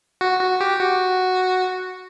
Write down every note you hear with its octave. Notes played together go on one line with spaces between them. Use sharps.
F#4
F#4
G4
F#4